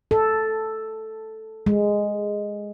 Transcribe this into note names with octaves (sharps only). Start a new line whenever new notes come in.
A4
G#3